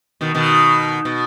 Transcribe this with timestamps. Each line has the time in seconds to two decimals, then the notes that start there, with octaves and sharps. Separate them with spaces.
0.21 B2 D#3
0.35 B2 D#3
1.05 B2